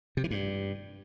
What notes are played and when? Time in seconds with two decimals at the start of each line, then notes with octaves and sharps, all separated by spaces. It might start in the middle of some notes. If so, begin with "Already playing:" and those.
0.17 C3
0.24 E3
0.31 G2